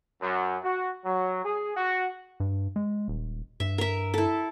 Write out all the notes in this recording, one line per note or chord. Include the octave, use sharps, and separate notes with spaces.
F#2
F#4
F#3
G#4
F#4
G2
G#3
D#1
G2 E5
A#4 E5
E4 A4